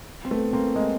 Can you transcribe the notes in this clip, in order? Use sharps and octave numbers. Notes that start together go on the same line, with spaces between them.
C4
A3 B3
A#3 C4
G#3 A#3